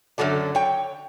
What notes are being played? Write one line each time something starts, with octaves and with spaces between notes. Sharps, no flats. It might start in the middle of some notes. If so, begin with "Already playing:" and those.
F#2 D3 F#3 A4 D5
C#5 G5